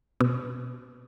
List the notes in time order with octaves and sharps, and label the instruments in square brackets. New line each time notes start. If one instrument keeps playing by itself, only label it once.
[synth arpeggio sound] B2